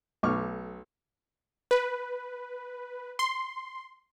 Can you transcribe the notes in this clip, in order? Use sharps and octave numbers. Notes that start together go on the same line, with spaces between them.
B1 A3 C#6 D6 F6
B4
C6